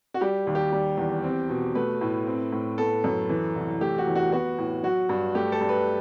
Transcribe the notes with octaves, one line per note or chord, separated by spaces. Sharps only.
F#4
G3 G4
D#2
G4
G3
E2
C4
B2
A3 B4
A2
C4
A2
B3 A4
F#2
E3
C2
A3 G4
F#4
E2
F#4
B3 F#4
A2
F#3 F#4
G2
A3 G4
A4
G2
B4